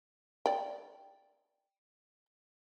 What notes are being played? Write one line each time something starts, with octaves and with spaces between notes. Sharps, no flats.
D5 G5